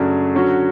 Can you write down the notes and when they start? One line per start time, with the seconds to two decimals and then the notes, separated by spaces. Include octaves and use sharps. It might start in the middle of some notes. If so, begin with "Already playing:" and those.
Already playing: F#2 C#3 F#3 A3 D4
0.34 D3 F#3 C#4 F#4